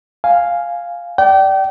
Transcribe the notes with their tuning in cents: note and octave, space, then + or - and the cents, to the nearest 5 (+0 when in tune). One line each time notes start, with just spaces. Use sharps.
F5 +0 G#5 +0
D5 +0 G5 -30